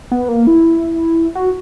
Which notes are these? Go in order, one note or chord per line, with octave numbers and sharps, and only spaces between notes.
B3
A#3
E4
F#4